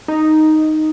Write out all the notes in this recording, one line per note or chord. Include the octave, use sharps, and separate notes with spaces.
D#4